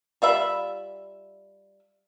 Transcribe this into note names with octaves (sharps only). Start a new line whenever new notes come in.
G3 F4 E5 B5